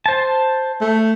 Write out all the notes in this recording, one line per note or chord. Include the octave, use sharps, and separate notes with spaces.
C5 A5
A3